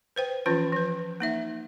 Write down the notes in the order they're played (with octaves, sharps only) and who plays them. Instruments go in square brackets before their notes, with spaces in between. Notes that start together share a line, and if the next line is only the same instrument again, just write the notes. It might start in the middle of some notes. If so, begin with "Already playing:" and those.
[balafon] B4 C5 G5
E3 F3 C#4 F4 B4
F3 B4
A#3 D#4 E5